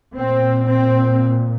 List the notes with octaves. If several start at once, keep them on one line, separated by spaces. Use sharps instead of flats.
A#2 C4
C4